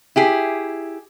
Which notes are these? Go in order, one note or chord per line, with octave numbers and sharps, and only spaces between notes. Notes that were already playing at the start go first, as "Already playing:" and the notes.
E4 G4 G#4